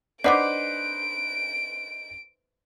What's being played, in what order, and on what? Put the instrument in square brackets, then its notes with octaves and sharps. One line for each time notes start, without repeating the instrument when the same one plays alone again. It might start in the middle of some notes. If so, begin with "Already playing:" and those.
[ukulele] D4 [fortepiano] D#4 B4 C5 [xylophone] D5 F#5 D6 [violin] D7